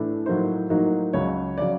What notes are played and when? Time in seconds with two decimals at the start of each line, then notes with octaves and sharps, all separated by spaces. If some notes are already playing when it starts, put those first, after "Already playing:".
Already playing: A2 E3 A3 D4
0.26 A2 F#3 A#3 D#4 C5
0.70 A2 F#3 A#3 D#4
1.13 C#2 C#3 F#3 C#5
1.58 C#3 F#3 D5